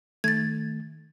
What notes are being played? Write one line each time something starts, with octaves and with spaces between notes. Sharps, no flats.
D#3 A3 G#6 A6